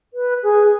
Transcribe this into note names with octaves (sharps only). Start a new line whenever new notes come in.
B4
G#4